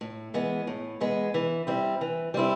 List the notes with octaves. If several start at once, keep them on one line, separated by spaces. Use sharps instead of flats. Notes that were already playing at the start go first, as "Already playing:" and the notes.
A2
E3 G#3 B3
A2
E3 G#3 B3
E3
G3 C4 E4
E3
G3 C4 E4